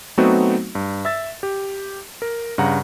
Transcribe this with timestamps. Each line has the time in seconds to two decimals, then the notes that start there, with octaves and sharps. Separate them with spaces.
0.18 F#3 A3 B3 C4 D#4 F#4
0.75 G2
1.05 E5 E6 A6
1.43 G4
2.22 A#4
2.58 G2 C#3 F#5 A#5